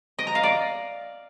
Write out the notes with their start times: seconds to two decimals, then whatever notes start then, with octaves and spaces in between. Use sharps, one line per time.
0.19 D#5
0.27 A#5
0.35 F5
0.43 D5